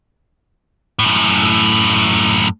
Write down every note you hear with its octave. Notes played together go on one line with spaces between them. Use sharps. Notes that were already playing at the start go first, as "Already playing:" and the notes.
F#2 A2